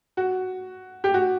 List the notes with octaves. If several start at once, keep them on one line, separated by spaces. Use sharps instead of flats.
F#4
G4
F#4